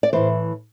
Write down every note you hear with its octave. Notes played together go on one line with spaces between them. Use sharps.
D5
A2 E3 C5